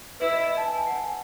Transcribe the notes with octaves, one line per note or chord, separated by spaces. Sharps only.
E4 B4
D#5
D#5
A5
G#5
A5
F#5
G#5